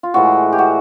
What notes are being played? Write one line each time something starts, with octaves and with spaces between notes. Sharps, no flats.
F4
A2 E3 G#3 F#4
G4
F#4